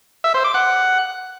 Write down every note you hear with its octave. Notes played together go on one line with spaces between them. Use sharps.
E5
C5
D6
F#5